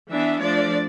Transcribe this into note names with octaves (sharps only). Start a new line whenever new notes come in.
E3 B3 D4 E5
F3 A3 D4 D5